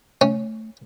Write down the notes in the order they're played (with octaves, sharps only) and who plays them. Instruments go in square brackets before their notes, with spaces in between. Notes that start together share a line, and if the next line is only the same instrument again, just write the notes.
[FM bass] A3 [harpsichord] C#4